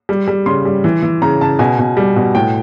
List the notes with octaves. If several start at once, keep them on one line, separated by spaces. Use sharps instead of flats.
G3
G3
C#3 C6
G3
E3
E3
C#3 A#5
C#3 A5
B2 G#5
B2
G3
B2
A2 G5